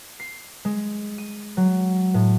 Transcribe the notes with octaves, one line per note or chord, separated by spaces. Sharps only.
C7
G#3
D#7
F#3
A2